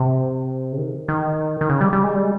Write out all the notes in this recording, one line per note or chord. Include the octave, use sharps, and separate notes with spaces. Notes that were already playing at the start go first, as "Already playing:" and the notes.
Already playing: C3
C#3
D#3
D#3
D#3
C#3
G3
G3
G#3
G3